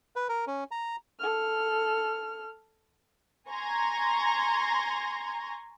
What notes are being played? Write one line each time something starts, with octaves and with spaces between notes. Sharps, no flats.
B4
A#4
C#4
A#5
A4 F6
G#5 A#5 C6 C#6 G#6 A#6